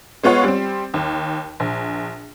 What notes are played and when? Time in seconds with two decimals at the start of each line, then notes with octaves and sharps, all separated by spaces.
0.24 G#3 B3 F4 C#5 F#5
0.44 G3 C4
0.94 D#2
1.60 A#1